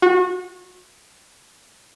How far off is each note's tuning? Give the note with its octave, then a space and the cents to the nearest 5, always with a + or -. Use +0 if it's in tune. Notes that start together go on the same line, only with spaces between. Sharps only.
F#4 -30